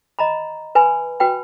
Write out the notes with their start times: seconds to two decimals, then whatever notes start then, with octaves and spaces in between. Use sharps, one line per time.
0.19 D#5 A#5 B5
0.75 B4 G#5 B5
1.20 F#4 B4 G5 B5